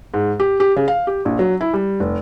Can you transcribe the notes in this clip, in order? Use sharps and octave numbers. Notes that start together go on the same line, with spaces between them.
G#2
G4
G4
C#3
F5
G4
A#1
F#3
E4
G3
F1